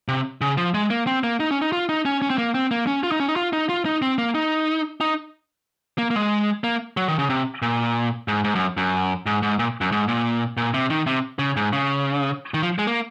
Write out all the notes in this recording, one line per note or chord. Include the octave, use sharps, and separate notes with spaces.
C3
C#3
F3
G#3
A#3
C4
A#3
D#4
C#4
D#4
F4
D#4
C#4
C#4
C4
A#3
C4
A#3
C#4
F4
D#4
C#4
D#4
F4
D#4
F4
D#4
C4
A#3
D#4
D#4
A#3
A#3
G#3
A#3
F#3
D#3
C#3
C3
A#2
G#2
G#2
F#2
F#2
G#2
G#2
A#2
F#2
G#2
A#2
A#2
C3
D#3
C3
C#3
G#2
C#3
D#3
F3
G#3
A#3